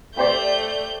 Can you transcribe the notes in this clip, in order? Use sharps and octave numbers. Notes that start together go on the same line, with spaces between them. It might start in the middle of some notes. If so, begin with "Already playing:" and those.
A3 G4 C5 D5 G6